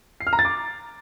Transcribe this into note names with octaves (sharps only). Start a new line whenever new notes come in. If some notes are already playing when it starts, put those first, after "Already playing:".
C7
F6
A#5
A6
D6